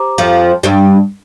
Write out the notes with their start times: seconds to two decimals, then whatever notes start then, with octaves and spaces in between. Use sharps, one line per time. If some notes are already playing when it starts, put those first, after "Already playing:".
Already playing: G4 C5 A#5 D6
0.18 F2 F3
0.63 G2 G3